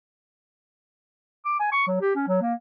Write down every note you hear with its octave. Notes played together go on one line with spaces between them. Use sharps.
D6
G#5
C#6
F#3
G4
C#4
F#3
A#3